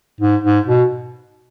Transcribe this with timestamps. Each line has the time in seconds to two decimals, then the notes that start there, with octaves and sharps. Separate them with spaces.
0.21 G#2
0.44 G#2
0.67 B2